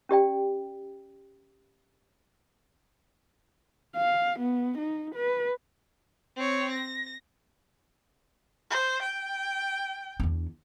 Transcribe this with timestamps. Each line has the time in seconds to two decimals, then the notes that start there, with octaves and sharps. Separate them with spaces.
0.09 C#4 G4 D5 G5
3.96 F5
4.39 B3
4.78 D#4
5.15 B4
6.37 C4 C#5
6.71 A#6
8.71 C5
9.02 G5
10.20 E2 D4